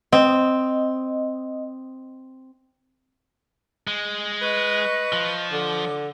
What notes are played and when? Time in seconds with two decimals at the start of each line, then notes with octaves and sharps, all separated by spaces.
0.13 C4 D#5
3.88 G#3
4.42 B4 D#5 C#6
5.13 F3
5.52 D3 D6